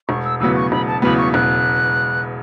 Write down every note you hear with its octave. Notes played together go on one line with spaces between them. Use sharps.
E1 C#6
E6
E2 C#3 F#3 B3 E6
C#6
E1 B5
A5
E2 C#3 F#3 B3 B5
C#6
E1 F#6